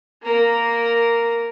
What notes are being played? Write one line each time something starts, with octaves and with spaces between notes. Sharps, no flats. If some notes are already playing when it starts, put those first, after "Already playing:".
A#3 A#4